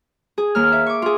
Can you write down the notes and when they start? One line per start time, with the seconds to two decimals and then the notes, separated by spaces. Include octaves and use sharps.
0.38 G#4
0.55 D#2 A#3 F6
0.72 E5
0.86 C#6 D6
1.02 F4 G#4